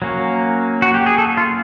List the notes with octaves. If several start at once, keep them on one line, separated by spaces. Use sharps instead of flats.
F#3 A#3 C#4
F#4
G4
G#4
A4
F4